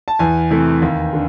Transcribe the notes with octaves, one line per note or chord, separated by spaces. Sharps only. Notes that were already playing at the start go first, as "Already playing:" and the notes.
A5
E2 G#5
C3 E3 A3
D#2
D3